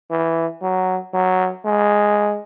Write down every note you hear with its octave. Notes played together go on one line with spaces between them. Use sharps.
E3
F#3
F#3
G#3